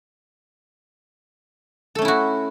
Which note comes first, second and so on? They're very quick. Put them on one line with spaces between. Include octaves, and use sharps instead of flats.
A4 A3 C#4 E4 F#4